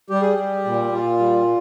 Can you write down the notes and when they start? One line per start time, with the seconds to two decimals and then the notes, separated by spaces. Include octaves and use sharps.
0.10 G3 G4
0.22 G#4
0.33 G3 G4
0.65 A#2
0.92 A#2 F4
1.19 G3